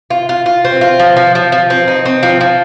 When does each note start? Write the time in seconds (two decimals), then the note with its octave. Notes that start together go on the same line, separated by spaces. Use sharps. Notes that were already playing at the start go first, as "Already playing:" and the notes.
0.10 F4
0.29 F4
0.46 F4
0.64 C4
0.81 F4
0.99 F3
1.16 F3
1.35 F3
1.52 F3
1.70 C4
1.88 D#4
2.05 C4
2.23 F3
2.41 F3